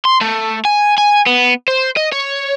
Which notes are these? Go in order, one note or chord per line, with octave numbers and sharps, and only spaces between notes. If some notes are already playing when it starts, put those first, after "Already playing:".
C6
A3
G#5
G#5
B3
C5
D#5
C#5